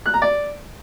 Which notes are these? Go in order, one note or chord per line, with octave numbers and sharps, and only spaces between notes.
F#6
A#5
D5